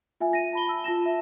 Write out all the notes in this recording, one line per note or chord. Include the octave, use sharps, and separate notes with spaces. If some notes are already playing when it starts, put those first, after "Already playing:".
F4 E5 G#5
A#6 D#7
A5 B5 G7
A5 E6
F4 A5 A#6 E7
E5